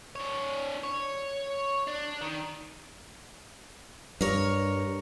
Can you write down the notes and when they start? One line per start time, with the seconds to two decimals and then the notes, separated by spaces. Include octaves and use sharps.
0.16 D4 C#5
0.84 C#5
1.87 D4
2.21 D#3
4.21 G2 A#4 C#5